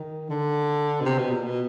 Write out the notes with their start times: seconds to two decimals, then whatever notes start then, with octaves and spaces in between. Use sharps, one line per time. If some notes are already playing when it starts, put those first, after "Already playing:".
Already playing: D#3
0.30 D3
1.01 B2
1.05 C3
1.18 B2
1.30 A#2
1.43 B2